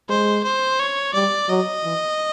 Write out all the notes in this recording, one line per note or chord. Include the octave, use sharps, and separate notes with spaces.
G#3 C5
C5
C#5
G3 D5
F#3 D#5
E3